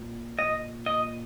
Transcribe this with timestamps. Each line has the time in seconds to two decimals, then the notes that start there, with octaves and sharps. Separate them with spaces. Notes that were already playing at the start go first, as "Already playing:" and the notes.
Already playing: A#2
0.39 A#2 D#5
0.86 D#5